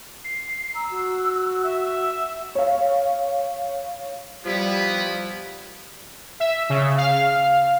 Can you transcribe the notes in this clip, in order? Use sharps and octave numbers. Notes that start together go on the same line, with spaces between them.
C7
A#5 E6
F#4
E5
C#5 F5
F3 G3 B3 E4 B5
E5
C#3
F5